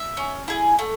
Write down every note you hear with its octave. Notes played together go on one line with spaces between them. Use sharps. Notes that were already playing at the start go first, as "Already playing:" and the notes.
Already playing: E5
C#4
E4 G#4
A3